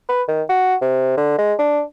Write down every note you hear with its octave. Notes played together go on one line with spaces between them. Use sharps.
B4
D#3
F#4
C3
D3
G#3
D4